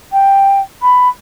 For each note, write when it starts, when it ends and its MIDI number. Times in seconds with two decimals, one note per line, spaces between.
0.12 0.59 79
0.82 1.08 83